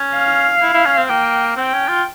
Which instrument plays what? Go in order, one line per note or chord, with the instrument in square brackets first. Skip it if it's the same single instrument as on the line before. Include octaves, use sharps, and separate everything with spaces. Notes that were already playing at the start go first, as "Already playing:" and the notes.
Already playing: [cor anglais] C#4
[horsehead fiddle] F5
[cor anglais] E4
E4
C#4
C4
[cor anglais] A#3 [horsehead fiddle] G5
[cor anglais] C4 [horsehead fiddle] G5
[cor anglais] C#4
F4